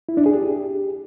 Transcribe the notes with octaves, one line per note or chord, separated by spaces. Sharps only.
E4
D4
G#4
G4